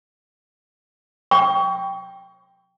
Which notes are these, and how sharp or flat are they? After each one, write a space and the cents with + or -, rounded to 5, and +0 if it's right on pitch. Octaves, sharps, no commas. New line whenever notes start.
G5 +0 C#6 +25